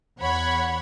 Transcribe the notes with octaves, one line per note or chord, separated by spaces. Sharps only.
E2 C#5 F#5 B5 G#6